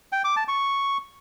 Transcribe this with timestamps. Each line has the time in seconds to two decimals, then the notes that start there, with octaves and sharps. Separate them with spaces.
0.12 G5
0.24 D6
0.36 A5
0.48 C#6